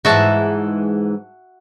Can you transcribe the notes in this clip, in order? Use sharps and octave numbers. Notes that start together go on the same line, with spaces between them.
G#2 E3 G#3 F#4 E5 A5